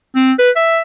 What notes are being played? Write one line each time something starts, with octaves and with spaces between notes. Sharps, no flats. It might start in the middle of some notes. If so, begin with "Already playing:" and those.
C4
B4
E5